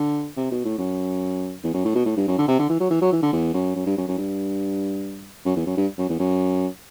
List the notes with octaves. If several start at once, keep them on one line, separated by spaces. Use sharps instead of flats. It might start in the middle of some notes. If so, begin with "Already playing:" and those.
Already playing: D3
C3
B2
A2
F#2
E2
F#2
A2
B2
A2
G2
F#2
D3
C3
D3
E3
F#3
E3
F#3
E3
D3
E2
F#2
F#2
G2
F#2
F#2
G2
F#2
E2
F#2
G2
F#2
E2
F#2